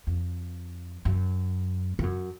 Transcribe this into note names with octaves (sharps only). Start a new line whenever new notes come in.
F2
F#2
G2
F#2